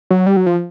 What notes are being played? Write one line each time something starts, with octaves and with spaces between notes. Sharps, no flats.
F#3
G3
F#3
F3